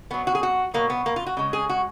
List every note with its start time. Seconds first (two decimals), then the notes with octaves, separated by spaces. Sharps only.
0.10 B2 F#3 B3
0.27 F#4
0.35 G#4
0.43 F#4
0.74 B2 F#3 A#3
0.90 B3
1.06 A#3
1.16 F4
1.26 F#4
1.37 C#3 G#3
1.53 G#4
1.69 F#4